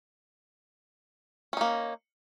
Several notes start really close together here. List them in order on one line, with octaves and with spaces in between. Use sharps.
C#4 D#4 A#3